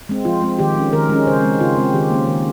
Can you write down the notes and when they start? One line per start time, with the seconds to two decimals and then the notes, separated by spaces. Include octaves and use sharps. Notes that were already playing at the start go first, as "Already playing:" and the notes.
0.09 G#3 C4
0.25 F3 F4
0.42 G#3 C4
0.59 D#3 G4
0.76 G#3 C#4
0.93 D#3 A#4
1.09 G#3 C#4
1.27 C#3 C5
1.43 G#3 C4
1.60 C#3 F4
1.77 G#3 C4
1.94 D#3 G4
2.11 A#3 C#4
2.27 D#3